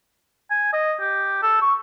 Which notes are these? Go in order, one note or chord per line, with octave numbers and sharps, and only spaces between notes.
G#5
D#5
G4
A4
C#6